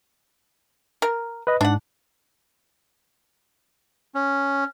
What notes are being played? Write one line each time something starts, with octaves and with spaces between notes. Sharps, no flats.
A#4
B4 D#5
G#2 D4 F#5
C#4